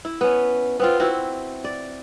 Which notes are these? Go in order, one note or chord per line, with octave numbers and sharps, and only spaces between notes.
E4
B3 C#4
B3 C4 F4
C4 E4 F#4
D5